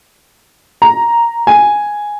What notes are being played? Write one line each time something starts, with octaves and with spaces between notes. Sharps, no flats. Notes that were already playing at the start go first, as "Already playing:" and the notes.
A#5
G#5